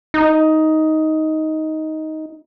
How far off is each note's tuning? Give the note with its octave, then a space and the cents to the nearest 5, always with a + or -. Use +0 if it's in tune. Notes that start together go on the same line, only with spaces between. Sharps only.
D#4 +10